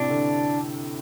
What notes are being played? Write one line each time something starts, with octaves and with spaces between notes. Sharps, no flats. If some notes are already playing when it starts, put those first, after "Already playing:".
Already playing: A2 C3 D4
D3